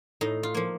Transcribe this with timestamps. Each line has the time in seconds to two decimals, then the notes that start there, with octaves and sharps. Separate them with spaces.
0.21 A2 D#4
0.43 F4
0.55 F3 A#3